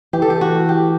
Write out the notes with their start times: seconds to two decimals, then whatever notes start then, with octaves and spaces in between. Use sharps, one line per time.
0.13 E3 G4
0.22 A4
0.30 G4
0.41 F#4
0.69 G4